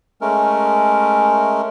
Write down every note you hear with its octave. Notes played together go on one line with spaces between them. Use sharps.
G#3 A3 C#4 A#4